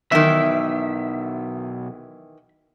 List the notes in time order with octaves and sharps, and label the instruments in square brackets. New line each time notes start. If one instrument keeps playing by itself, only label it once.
[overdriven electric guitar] B1 [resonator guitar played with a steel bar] D#3 E3 [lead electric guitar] E5